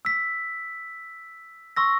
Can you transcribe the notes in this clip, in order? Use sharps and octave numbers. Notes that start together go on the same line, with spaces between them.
E6 B6
C6 C#6 E6 A#6